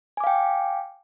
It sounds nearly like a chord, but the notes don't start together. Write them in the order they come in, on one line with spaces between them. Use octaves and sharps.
G#5 D6 F5 G5